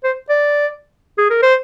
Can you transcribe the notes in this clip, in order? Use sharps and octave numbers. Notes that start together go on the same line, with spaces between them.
C5
D5
G#4
A#4
C5